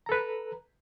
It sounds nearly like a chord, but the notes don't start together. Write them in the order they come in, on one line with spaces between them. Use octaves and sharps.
A#5 A4 B4